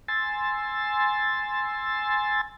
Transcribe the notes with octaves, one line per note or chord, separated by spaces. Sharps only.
G#5 C6 E6 A6